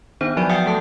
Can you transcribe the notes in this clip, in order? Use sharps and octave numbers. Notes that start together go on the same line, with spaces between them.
D#3 B3 D4 D#4 C5
F3 F#3 F#4 D5 D7 E7
E5 F#5 G5 D#6 G6 C#7
A3 A4 A5 D#6